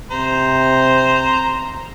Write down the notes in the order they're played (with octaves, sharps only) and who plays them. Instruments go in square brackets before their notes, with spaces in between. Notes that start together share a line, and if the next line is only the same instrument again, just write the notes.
[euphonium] C3 [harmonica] C5 A#5